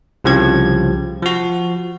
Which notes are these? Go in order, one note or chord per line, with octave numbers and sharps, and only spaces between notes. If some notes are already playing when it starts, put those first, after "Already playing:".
C2 C#3 F3 G4 G#6
F3 F#4